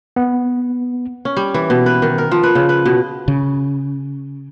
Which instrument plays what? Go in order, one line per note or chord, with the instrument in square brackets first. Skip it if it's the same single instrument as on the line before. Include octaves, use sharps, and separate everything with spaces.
[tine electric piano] B3
[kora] C#4
G3
E3
B2
B4
D#3
A#4
F3
B4
C#3
B4
B2
[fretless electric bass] C#3